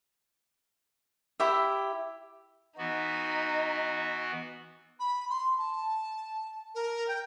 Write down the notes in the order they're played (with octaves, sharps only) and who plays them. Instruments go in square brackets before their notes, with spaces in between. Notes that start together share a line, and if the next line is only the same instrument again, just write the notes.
[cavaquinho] E4 G4 E5
[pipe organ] E3 B3 F#4 [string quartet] D#4
[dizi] B5
C6
A5
A#4
G5